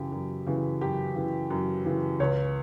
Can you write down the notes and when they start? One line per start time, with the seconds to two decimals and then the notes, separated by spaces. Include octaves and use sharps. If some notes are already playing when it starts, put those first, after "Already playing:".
Already playing: F#2 C#3 E3 G4
0.12 F#2
0.47 C#3 E3
0.81 F#2 G4
1.15 C#3 E3
1.50 F#2
1.85 C#3 E3
2.20 C#2 C#5